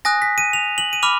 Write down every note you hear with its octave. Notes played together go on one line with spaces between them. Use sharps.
G#5 D#6 F#6 A#6
B6
D#7
F7
F#7
D#7
B5 D6 F6 F7